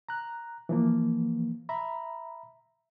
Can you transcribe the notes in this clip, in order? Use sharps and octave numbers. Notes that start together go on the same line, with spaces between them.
A#5 F#6
E3 F3 A#3
E5 A#5 B5